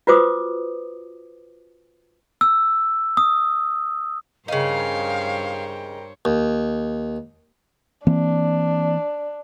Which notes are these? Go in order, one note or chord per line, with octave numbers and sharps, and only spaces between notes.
F4 F#4 B4 C5 D6 D#6
E6
D#6
G2 C#3 D#4 A#4 C5 C#5 F5 G5
D#2
E3 A#3 C4 D4